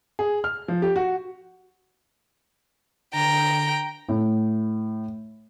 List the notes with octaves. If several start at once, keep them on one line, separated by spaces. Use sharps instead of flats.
G#4
F6
F3
G4
F#4
D3 G5 A#5
A2